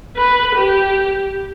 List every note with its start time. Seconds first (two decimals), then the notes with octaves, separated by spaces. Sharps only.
0.17 B4
0.55 G4